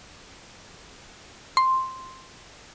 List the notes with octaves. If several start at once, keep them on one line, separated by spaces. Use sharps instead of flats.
C6